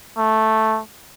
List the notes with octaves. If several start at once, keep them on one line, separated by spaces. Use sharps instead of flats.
A3